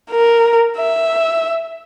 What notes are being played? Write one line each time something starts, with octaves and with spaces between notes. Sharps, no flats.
A#4
E5